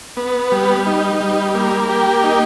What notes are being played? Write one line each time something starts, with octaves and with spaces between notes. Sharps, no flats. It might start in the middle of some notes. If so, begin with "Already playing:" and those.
B3
G3
D#4
G3
A#3
G4
D#4